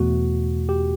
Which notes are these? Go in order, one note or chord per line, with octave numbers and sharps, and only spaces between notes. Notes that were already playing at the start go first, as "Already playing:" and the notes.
Already playing: E2 B2 A3 F#4
G4